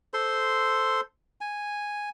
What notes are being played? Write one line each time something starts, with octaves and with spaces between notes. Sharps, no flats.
A4 C5 C6
G#5